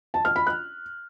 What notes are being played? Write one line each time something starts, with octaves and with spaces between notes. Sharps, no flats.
A5
F6
B5
F#6